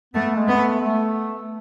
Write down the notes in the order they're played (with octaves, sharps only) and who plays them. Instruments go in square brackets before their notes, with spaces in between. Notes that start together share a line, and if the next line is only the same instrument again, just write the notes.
[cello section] A3 [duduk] B3
[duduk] G#3
[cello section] B3
[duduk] A3
A3